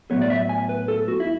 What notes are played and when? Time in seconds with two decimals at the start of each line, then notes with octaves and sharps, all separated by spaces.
0.10 A2 F#3 B3 C#5
0.21 D5
0.30 E5
0.49 G#5
0.69 B4
0.88 A4
1.08 F#4
1.20 E4